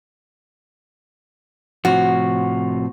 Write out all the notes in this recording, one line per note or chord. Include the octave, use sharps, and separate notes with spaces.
A2 C3 F3 F#4